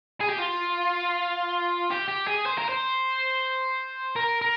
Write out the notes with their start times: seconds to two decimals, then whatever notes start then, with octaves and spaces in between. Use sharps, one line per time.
0.21 G#4
0.30 G4
0.39 F4
1.90 G4
2.08 G4
2.27 G#4
2.46 C5
2.58 A#4
2.69 C5
4.16 A#4
4.42 A#4